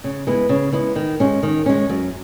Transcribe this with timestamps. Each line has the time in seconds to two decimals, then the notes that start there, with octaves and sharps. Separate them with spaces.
0.04 C#3
0.27 G#3 B3 E4
0.49 C#3
0.73 G#3 B3 E4
0.96 D#3
1.20 G#3 C#4
1.43 D#3
1.66 G#3 C#4
1.89 F#2